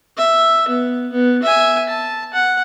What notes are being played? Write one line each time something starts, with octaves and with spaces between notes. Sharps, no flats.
E5
B3
B3
E5 G#5
A5
F#5